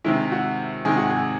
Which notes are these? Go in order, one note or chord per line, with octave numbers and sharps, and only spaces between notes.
C3 D#3 G#3 E4
F#4
C3 D#3 G#3 G#4
F#4
G#4